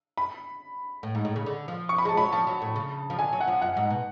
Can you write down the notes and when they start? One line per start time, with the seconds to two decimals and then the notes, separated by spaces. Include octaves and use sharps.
0.17 B5
1.03 A2
1.15 G#2
1.25 A2
1.36 C#3
1.46 D3
1.68 F3
1.89 C#6
1.98 B5
2.05 G#3 A5
2.17 F#3 B5
2.32 F3 A5
2.47 F#3
2.62 A2
2.76 C#3
3.10 F3
3.18 D3 G#5
3.33 F#3
3.40 F#5
3.48 F3
3.62 F#2 F#5
3.77 G#2
3.90 B2